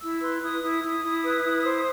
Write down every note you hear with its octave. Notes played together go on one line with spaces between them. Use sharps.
E4 E6
B4 C6
E4 D#6
E4 D#6
E4
E4
B4
E4
C5